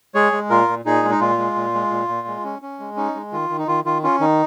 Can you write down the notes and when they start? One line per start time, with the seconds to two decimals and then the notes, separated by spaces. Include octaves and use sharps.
0.14 G#3 G#4 C#5
0.32 G#3
0.50 A#2 F4 A#4
0.68 A#2
0.85 A#2 D#4 G#4
1.03 G#3
1.11 D#4
1.20 A#2 F4
1.38 G#3
1.56 A#2
1.74 G#3
1.91 A#2
2.08 A#2
2.27 G#3
2.44 C#4
2.62 C#4
2.79 G#3
2.97 C#4 D#4
3.15 G#3
3.32 D#3 F4
3.49 D#3
3.58 D#4
3.68 D#3 F4
3.85 D#3 F4
4.04 C#4 F4
4.20 D#3 D#4